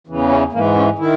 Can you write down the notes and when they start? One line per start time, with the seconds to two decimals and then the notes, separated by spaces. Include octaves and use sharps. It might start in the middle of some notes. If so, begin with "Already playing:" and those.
0.07 E2 C#3 E3
0.29 C#4
0.52 G#2 E3 A#3
0.75 C#4
0.98 D#3 E4